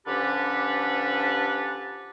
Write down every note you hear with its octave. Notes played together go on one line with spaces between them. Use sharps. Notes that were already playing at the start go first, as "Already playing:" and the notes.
D3 F3 C#4 G4 A4 B4